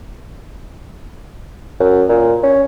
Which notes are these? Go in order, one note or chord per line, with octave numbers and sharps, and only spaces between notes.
F#2
A#2
C#4